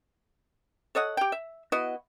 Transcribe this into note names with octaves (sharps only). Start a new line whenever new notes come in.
A4 C#5 D#5 F#5
G4 G5
E5
B3 E4 F#4 D#5